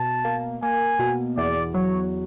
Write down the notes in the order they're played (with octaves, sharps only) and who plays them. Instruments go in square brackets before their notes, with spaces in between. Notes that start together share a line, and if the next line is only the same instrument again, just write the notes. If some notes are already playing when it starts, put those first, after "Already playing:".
Already playing: [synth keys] B2 [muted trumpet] A5
[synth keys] A#3
[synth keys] A#3 [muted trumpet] G#5
[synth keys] B2
[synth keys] E2 [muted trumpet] D5
[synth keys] F#3 [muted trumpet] C#5